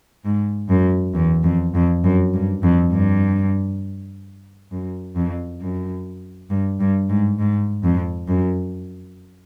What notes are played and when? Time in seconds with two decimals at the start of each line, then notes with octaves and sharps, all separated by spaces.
0.25 G#2
0.69 F#2
1.15 E2
1.44 F2
1.75 F2
2.04 F#2
2.34 G2
2.63 F2
2.93 G2
4.72 F#2
5.16 F2
5.61 F#2
6.50 G2
6.80 G2
7.10 G#2
7.39 G#2
7.84 F2
8.28 F#2